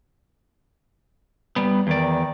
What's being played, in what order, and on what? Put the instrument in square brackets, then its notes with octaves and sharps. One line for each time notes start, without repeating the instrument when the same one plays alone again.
[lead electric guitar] G3 B3
[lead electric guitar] E2 D5 [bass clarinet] D#3